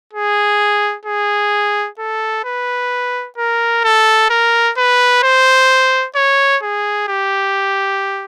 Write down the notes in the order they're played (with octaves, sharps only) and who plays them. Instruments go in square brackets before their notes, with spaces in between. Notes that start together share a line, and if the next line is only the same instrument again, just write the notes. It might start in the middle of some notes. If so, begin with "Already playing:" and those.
[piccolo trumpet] G#4
G#4
A4
B4
A#4
A4
A#4
B4
C5
C#5
G#4
G4